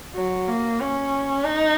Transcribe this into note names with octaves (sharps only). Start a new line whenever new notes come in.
F#3
A#3
C#4
D#4